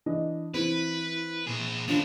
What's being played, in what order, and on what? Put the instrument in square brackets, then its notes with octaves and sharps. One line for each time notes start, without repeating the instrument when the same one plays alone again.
[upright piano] E3 D4 D#5
[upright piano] E3 C4 [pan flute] E4 [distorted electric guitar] B4
[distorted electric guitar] A#2 G#4
[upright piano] D#3 F3 [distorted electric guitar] C#4 A4 [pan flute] D4